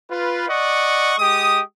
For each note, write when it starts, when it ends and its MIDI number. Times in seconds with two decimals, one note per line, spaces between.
0.10 0.46 65
0.10 0.46 71
0.48 1.14 74
0.48 1.14 75
0.48 1.14 78
0.48 1.14 85
1.19 1.60 56
1.19 1.60 67
1.19 1.60 87